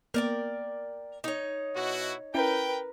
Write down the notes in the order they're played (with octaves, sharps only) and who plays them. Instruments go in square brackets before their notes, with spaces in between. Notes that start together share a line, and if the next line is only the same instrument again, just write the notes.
[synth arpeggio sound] A#3 B3 [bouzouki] A#4 D5 G5
[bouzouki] D#4 C#5
[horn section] B2 E4 F#4
[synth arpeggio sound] C#4 E4 [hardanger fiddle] A#4 B4 [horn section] G5